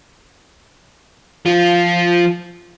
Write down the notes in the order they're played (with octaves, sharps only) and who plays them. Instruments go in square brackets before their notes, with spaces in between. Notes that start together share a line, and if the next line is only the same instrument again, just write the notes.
[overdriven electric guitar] F3 F4